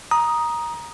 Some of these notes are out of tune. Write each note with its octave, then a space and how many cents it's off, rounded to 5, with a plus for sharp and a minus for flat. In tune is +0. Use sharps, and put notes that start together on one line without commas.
A#5 +15 D#6 +0